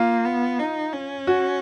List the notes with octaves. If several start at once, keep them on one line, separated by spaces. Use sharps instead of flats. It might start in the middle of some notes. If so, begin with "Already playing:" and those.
Already playing: A#3 F4
B3
D#4
C#4
F#4